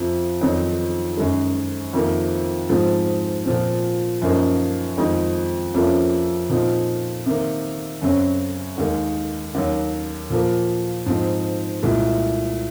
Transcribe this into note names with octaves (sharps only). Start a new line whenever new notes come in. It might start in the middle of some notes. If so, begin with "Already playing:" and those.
Already playing: F2 C3 F3
F2 D#3 F#3 C4 D#4
F#2 D#3 G#3
F2 C3 D#3 A#3
G#2 F3 G#3 C4
A#2 F3 C4
F#2 F3 A#3 D#4
F2 D#3 G#3 D#4
F2 C3 F3 A#3 C#4
A#2 F3 C4 D#4
C3 D#3 A#3
F#2 C#3 F#3 C4
D#2 D#3 G#3
D#2 D#3 F#3
A#2 F3 A#3
G#2 F3 C4 D#4
C2 A#2 G#3